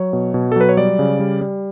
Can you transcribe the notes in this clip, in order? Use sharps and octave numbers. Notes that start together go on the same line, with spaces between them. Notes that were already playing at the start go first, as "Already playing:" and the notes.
Already playing: F#3 C#5
B2
B2
A4
F#3 B4
C#5
G3 D5
C#3
G3
G3